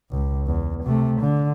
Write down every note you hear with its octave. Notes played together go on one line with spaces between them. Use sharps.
C#2
E2
C3 A3
D3